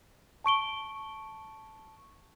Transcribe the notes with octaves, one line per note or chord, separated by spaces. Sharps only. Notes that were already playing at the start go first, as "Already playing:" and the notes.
A5 C#6 D7 G7